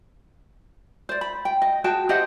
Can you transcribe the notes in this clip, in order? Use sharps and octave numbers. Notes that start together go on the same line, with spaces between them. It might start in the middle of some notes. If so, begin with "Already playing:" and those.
C5 D5
B5
G5
D#5
F#4 G#4 G5 A5
G4 C5 D#5 F#5